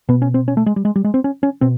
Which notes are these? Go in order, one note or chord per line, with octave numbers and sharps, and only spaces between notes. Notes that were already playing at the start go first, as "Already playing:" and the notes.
B2 B3
C#4
C4
C#4
A3
G#3
G3
G#3
G3
G#3
C4
C#4
C#4
B2 C4